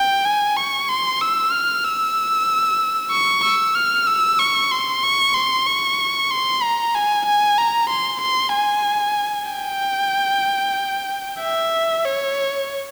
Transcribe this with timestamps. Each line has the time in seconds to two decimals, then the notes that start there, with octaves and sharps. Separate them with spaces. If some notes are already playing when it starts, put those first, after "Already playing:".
Already playing: G5
0.25 G#5
0.56 C#6
0.89 C6
1.21 E6
1.52 F6
1.84 E6
3.11 C#6
3.43 E6
3.75 F6
4.07 E6
4.39 C#6
4.72 C6
5.03 C#6
5.34 C6
5.67 C#6
6.31 C6
6.62 A#5
6.94 G#5
7.26 G#5
7.58 A#5
7.90 C6
8.21 C6
8.54 G#5
9.50 G5
11.40 E5
12.04 C#5